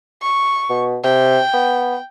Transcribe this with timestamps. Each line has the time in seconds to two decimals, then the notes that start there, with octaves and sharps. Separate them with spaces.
0.22 C#6
0.70 B2
1.04 C3 G5
1.54 B3